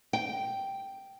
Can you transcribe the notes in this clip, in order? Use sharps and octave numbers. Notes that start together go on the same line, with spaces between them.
G5